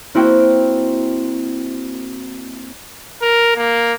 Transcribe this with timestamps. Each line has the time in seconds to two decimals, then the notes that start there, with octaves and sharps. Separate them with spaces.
0.15 A#3 C4 E4 F#4 G5
3.22 A#4
3.56 A#3